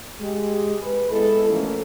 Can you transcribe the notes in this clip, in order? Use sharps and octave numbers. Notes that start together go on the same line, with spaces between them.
G#3 G4
B4
G#3 B3 E4 A4
E3 F3 A3 A#3 C#4